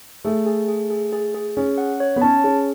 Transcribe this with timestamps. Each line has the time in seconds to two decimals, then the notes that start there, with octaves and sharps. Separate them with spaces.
0.25 A3 G#4
0.46 G#4
0.68 G#4
0.90 G#4
1.13 G#4
1.35 G#4
1.57 C#4 G#4
1.78 F#5
2.00 C#5
2.16 B3
2.22 C#4 A5
2.44 C#4 G#4